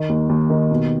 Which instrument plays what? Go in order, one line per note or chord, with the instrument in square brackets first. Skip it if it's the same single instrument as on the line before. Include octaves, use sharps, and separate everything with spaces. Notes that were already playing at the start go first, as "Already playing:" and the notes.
Already playing: [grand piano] D#3
D#2
D#2
D#3
B2